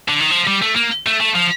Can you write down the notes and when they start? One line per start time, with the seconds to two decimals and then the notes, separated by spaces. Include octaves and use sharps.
0.08 D3
0.20 D#3
0.31 F3
0.47 G3
0.62 A3
0.76 A#3
1.07 A3
1.20 A3
1.35 F3